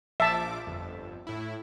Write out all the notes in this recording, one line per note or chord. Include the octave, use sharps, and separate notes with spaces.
A#1 F3 E5 A5 D6
G1 F2
A2 E4